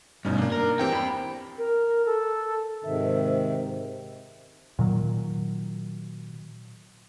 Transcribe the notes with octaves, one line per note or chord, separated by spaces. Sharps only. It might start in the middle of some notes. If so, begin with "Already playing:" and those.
G2 B2 C#4 D#4
A#3 D4
A#4
E3 C4 G4 G5
E2 B5
A#4
A4
G#2 C3 D#3 E5
A#2 D#3 F#3